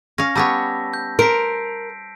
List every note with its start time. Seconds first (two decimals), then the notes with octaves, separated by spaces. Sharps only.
0.18 C#4 F5 A#6
0.35 G3 B3 C#5 A5 E6 B6
0.94 G6
1.19 A#4 C5 B6 C7 D7